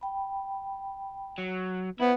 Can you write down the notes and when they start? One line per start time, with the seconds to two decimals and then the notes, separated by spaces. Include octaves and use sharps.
0.01 G5 B5
1.38 F#3
2.00 B3 E4 C5